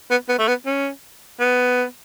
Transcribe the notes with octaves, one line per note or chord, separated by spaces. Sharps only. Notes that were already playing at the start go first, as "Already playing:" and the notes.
B3
B3
A3
B3
C#4
B3